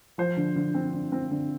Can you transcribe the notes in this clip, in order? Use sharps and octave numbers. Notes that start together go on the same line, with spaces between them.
F3 C5
D3
D3
C4
D3
C4
D3